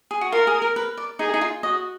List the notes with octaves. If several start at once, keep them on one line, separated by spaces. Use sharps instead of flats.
G#4
F#4
F4 A#4
G#4
A#4
B4
D5
D#4 G#4
D#4
F4
F#4 D#5